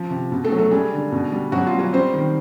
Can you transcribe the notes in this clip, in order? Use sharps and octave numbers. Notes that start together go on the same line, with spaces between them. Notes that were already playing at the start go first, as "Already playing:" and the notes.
Already playing: F3
C3
B2
A3 A4
F#3
A3 A4
G3 G#3 G#4
D3
B2
G3
B2 F#3 F#4
F4
G3
F#3 F#4
G3 C4 C5
D#3